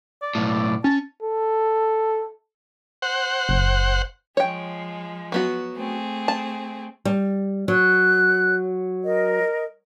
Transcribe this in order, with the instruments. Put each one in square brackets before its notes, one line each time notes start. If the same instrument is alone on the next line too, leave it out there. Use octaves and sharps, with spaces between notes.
[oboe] D5
[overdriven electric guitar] B1 A2
[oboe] D5
[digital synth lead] C#4 [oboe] A5
[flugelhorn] A4
[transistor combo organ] C5 F#5
[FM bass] F#1
[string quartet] F3 G#3 [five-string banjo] C#5 G5
[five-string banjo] F#3 B3 F#4
[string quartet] A3 C4 G#4
[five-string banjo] A5
[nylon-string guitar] G3
[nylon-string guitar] F#3 [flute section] F#6
[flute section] A#4 D#5